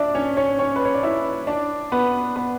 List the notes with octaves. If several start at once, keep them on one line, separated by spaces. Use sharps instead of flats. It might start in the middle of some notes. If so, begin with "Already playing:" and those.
Already playing: D4 D5 E5
C#4 C#5
C#4 C#5
C#4 C#5
B4
C#5
D5
E4 E5
D4 D5
B3 B4
B3 B4